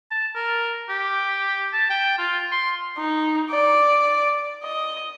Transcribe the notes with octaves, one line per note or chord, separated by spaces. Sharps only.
A5
A#4
G4
A5
G5
F4
C6
D#4
D5
D#5